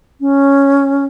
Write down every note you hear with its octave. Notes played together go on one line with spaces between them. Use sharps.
C#4